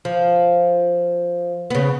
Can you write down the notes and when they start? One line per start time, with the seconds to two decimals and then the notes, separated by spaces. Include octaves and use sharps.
0.05 F3
1.70 C#3 B3